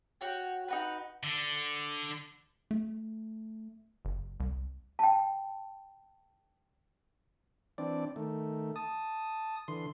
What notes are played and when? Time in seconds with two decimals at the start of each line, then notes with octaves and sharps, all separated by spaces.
0.21 F#4 C#5 G5
0.68 D#4 F#4 B4
1.24 D3
2.71 A3
4.05 F#1
4.40 C2
4.99 G5 A5
7.78 E3 C4 D4 D5
8.16 D#3 A3
8.76 A5 D#6
9.68 D3 E3 C6